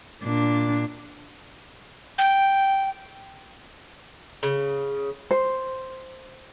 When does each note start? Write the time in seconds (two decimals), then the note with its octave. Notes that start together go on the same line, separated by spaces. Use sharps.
0.24 A#2 D4
2.18 G5
4.43 C#3
5.31 C5